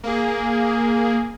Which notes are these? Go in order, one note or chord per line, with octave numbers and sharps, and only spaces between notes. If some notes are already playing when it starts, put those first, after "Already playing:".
A#3 G#4